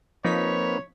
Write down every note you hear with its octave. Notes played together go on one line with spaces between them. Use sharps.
F3 A#3 C4 D#4 B4 C#5 B6